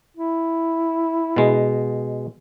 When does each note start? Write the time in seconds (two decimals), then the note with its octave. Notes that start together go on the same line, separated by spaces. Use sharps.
0.17 E4
1.36 B2 G#3